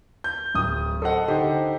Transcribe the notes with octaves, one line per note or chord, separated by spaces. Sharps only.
G6
D1 D#6
A4 C5 D#5 F#5
D3 D#4 G4 C5